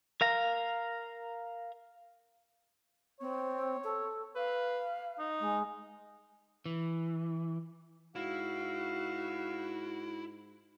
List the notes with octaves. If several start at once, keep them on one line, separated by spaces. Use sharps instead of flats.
A#4 F5 A#5
C4 C#5
A4
B4 F5
D#4
G#3
E3
G#2 E4 F#4 F5